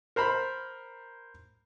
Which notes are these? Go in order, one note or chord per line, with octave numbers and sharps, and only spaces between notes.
A#4 C5 A#5 B5